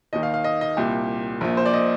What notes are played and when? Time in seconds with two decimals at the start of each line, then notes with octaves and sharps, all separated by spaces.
0.13 D#2 D#3 D#5
0.23 F5
0.34 F5
0.44 D#5
0.61 D#5
0.77 C2 A#2 G4
1.41 A#1 A#2
1.57 C5
1.66 D5
1.74 D#5